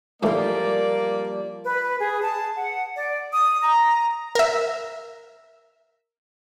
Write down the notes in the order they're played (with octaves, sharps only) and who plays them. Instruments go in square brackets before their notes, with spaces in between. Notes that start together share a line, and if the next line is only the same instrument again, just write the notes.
[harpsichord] G#2 E3 A3 [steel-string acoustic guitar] F3 G3 [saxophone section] A#3 [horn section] A#4 D5
[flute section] B4
G#4
A5
F#5
D5
D#6
A#5
[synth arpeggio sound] A#4 E5